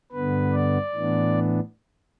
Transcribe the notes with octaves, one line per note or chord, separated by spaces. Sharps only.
G2 D3 B3 B4
D5
A2 E3 B3 D4